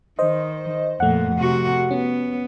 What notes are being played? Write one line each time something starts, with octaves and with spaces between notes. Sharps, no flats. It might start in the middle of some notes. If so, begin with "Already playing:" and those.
D#3 C5 D#5
F2 A#2 A3 F#5
C3 F#4
B3 C#4